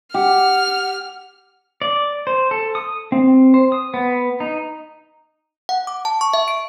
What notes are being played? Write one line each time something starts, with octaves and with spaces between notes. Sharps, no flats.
G4 F#5 F6
D5
C5
A4
D#6
C4
C5
D#6
B3
D#4
F#5
D6
A5
C#6
E5
D7